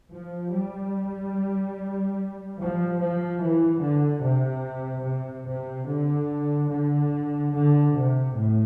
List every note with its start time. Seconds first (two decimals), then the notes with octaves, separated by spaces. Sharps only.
0.11 F3
0.52 G3
2.58 F3
2.99 F3
3.40 E3
3.81 D3
4.23 C3
5.05 C3
5.46 C3
5.87 D3
6.70 D3
7.52 D3
7.94 C3
8.35 A2